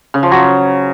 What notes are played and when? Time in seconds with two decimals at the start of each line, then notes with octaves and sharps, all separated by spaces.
0.14 C#3
0.23 F3
0.31 F#3